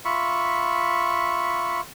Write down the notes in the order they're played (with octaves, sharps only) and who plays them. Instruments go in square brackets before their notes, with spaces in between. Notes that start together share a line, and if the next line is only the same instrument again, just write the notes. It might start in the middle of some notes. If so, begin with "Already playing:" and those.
[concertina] F4 E5 B5 C#6